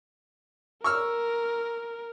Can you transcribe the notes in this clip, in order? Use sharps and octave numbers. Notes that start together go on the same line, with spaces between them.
A#4 C#6 E6 F6